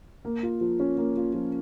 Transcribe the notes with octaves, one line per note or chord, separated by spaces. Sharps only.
A#3
F4
F3
C#4
A#3
F4
F3